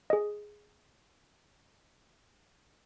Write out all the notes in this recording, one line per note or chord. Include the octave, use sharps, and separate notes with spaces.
G#4 D#5